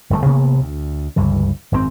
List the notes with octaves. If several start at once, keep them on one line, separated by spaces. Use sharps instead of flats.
G1 F#2 A2 A3
A1 C3 A#3 B3
D2
G1 C#2 G2 E3
G#1 F#2 A#2 C4